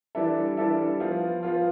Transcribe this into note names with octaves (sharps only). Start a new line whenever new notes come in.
E3 G3 D4 A4 E5
E3 G3 D4 A4 E5
F3 B3 F4
F3 B3 F4